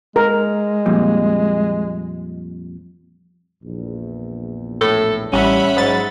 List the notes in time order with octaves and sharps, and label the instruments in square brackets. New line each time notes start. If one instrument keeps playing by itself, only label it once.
[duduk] G#3 [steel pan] A#4
[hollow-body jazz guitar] F2 A#2 G3
[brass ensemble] A#1 E2
[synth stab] A2 [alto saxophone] A4
[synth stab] A1 [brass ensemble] G3 [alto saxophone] C#4 [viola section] E5 F#5 B5
[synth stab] G#2 A6 [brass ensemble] F#3